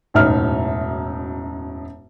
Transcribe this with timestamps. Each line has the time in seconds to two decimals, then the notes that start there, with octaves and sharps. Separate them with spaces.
0.14 E1 F#2 A2 D#4 E5 F6